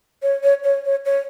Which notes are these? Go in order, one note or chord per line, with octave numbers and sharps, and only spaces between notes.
C#5
C#5
C#5
C#5
C#5